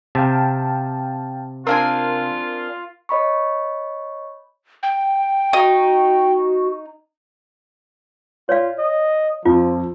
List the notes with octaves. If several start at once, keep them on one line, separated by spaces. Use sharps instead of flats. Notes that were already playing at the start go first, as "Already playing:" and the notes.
C3 F5 G5 A5
C4 D4 F4 A#4 F5 G#5
C#5 D#5 B5 C#6
G5
D#4 F#4
F4 C#5 D5 F5
D#5
F2 F3 F4